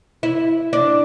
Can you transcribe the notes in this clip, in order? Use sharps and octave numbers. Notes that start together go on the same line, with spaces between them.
E4
D4